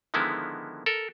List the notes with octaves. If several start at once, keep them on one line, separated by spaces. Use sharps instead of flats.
D3 D#3 F3 G#3 B3 E4
A4 A#4